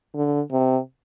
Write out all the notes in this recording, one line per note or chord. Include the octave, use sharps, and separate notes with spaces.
D3
C3